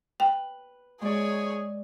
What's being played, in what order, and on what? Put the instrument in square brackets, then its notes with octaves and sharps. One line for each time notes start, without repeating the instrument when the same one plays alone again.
[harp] B4 [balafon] G5
[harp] G#3 D5 [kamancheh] G#4 C#5